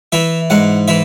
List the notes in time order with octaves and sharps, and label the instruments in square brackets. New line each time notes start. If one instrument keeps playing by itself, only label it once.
[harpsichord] E3 E5
G#2 F#5
E3 E5